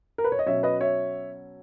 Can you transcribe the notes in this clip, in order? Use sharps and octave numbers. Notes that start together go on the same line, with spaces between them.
A#4
B4
C#5
D#5
B2 F#3 C#4 C#5 E5
B4 D#5
C#5 E5